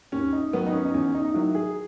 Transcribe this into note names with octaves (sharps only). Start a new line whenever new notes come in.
D#2 C#4
D#4
D#3 F#3 B3
D#4
C#4
D#4
E2 C#4
D#4
D#4
D#3 F#3 E4
G#4